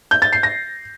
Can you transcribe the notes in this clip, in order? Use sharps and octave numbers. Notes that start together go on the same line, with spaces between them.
G6
A6
C7
A#6